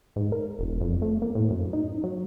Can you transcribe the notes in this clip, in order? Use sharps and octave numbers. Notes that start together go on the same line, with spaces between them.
G#2
A#4
E1
F2
A3
A#3
A2
F#2
D#4
F#3